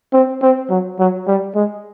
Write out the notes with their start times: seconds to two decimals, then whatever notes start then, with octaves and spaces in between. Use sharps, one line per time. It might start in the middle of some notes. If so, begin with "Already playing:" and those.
0.13 C4
0.42 C4
0.70 F#3
0.99 F#3
1.27 G3
1.55 G#3